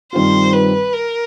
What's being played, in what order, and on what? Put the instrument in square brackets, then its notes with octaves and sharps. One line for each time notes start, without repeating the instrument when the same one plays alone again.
[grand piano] G2 D#3 G3 C4 F4 [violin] C5
[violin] B4
A#4